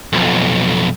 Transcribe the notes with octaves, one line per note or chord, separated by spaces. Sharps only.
B1 F2